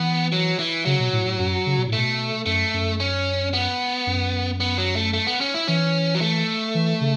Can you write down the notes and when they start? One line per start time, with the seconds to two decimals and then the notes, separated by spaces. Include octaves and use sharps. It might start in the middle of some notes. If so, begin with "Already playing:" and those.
Already playing: E3 B3
0.32 F#3
0.59 E3
0.85 C#3 F#3
1.00 B2
1.13 A2
1.25 A2
1.39 F#2
1.66 C#3
1.77 B2
1.88 A2
1.93 B2 A3
2.46 F#2 A3
2.74 F#2
3.00 C#4
3.54 B3
4.07 F#2
4.60 B3
4.78 F#3
4.96 A3
5.14 A3
5.27 B3
5.41 C#4
5.54 E4
5.68 E3 C#4
6.15 F#3
6.21 A3
6.75 E3
7.01 C#3